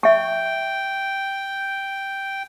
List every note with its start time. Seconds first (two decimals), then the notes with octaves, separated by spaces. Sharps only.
0.03 E5 G5 C#6